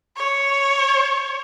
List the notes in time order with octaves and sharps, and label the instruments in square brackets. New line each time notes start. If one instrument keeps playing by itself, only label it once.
[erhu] C#5